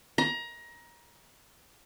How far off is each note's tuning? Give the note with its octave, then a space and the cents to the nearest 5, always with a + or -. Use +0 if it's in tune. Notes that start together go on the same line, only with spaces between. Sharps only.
A#5 +25